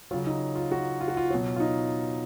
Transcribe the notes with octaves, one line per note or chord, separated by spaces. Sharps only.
C#3 F#3 F4
D#4
F4
F#4
F4
F#4
F4
B2 F#3
F4
D#4